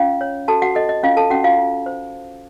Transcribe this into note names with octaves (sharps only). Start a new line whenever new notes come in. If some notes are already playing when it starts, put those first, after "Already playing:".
Already playing: C#4 F4 F5
C#5
F#4 A4 A5
F#4 F#5
A4 D#5
D#5
C#4 F4 F5
A4 A5
C#4 F#4 F#5
F4 F5
F4
C5